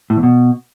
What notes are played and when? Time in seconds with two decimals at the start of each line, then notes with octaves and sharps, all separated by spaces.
0.10 A2
0.17 E2
0.23 B2